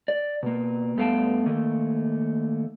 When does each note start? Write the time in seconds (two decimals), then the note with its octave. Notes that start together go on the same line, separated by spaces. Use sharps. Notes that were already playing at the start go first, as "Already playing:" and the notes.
0.08 D5
0.43 B2 A#3
0.97 G2 A3 B3 F5 G5 A5
1.46 D#3 A3 A#3